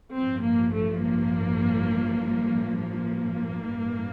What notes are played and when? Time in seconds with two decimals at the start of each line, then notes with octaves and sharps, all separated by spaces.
0.16 A1 G2 F3 C4
0.44 A#3
0.74 A3
1.03 A#3
2.79 A#3
3.66 A1 G2 E3